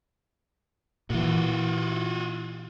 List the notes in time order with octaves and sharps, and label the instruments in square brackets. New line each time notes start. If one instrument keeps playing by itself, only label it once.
[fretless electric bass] A#2 E3 [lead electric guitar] F4 F#4